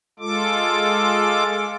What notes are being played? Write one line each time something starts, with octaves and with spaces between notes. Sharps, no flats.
G#3 F4 A4 D6